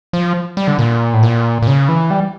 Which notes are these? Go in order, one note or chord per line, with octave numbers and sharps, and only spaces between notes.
F3
G3
D3
A#2
A2
A#2
A#2
C#3
E3
G3